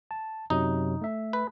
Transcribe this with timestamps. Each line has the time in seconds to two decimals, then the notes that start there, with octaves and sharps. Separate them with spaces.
0.11 A5
0.50 F#2 C3 F#3 D#4
1.02 A3 E5
1.33 B4